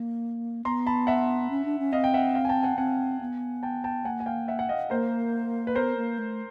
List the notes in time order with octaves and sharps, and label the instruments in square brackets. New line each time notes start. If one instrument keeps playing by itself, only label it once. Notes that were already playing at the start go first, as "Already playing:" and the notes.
Already playing: [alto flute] A#3
[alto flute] B3 [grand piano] A#5 C6
[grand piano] A5 B5
E5 F#5
[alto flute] C#4
D4
C#4
[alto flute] C4 [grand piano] D#5 F5
[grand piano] G5
E5 F#5
F5 G5
G#5
G5 A5
F#5 G#5
[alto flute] C4 [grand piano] F#5 G#5
[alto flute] B3
[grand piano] G5 A5
G5 A5
[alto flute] A#3 [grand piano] F#5 G#5
[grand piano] G#5
F5 G5
E5 F#5
F#5
D#5 F5
[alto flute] A#3 [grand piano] A#4 C5
[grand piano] B4
[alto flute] B3 [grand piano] A#4 C5
[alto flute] A#3
A3